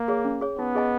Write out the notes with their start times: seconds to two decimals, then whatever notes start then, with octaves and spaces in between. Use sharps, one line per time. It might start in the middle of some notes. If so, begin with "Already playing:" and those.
Already playing: A#3
0.08 G#4 C#5
0.25 C#4
0.41 G#4 C#5
0.58 B3 D#4
0.75 G#4 D#5 G#5